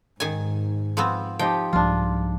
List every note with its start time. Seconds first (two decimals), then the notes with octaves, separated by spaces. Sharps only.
0.20 G#2 D#3 G#5
0.97 F3 B3 C4
1.39 F3 D#4 G4 G5
1.73 C2 G#2 F3 D4 F4